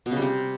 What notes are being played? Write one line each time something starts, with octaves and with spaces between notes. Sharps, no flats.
B2
C#3
G3
C3